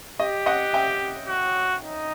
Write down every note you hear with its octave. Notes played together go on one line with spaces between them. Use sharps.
G4 D#5
D#5 F#5
E5 G5
F#4
D#4